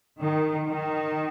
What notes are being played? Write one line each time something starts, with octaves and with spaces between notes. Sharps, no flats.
D#3
D#3